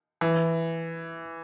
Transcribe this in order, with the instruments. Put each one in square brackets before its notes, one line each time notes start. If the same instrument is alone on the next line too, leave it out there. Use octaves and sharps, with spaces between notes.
[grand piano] E3